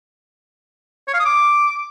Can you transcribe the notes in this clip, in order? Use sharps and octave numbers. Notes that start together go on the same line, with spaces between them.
C#5
F5
D#6
D6